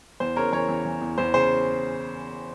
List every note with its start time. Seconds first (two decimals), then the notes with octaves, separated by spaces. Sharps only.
0.20 E2 C5
0.36 C#3 A#4 C#5
0.52 E3 A#4 C#5
0.69 E2
0.85 E3
1.01 E2
1.18 E2 C5
1.34 C#3 C5